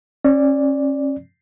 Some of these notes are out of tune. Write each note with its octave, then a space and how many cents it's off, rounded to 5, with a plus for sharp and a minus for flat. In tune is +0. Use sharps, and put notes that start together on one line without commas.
C#4 -30 D5 +0